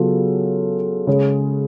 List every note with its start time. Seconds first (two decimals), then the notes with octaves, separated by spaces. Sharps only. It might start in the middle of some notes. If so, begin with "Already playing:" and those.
Already playing: C#3 F#3 B3 F4 A4
1.07 C#3 G#3 C#4 G#4